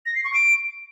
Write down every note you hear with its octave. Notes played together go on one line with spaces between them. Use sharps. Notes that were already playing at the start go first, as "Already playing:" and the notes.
A#6
C7
C#6
D7